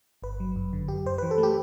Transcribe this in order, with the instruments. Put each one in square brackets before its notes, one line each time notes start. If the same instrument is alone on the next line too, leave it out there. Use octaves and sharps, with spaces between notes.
[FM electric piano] G1 B4
F#3
F#2
D3
F#2 G4
F#2 C5
E3 B4
A4
A3
G4